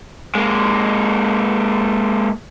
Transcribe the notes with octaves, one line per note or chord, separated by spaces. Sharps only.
G#3 A#3